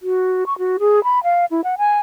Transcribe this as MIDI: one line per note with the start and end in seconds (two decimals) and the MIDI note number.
0.01 0.44 66
0.46 0.57 85
0.58 0.77 66
0.79 1.03 68
1.04 1.22 83
1.23 1.45 77
1.51 1.61 64
1.64 1.75 78
1.78 2.00 80